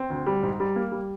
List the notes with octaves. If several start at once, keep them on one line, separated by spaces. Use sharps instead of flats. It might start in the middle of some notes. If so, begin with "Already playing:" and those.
Already playing: C4
D2
G3
G#2
G3
A#3
G3